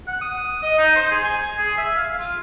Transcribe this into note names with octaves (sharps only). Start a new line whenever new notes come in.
F#5
D#6
D#5
D#4
C5
G#4
G#5
G#4
E5
F5
F4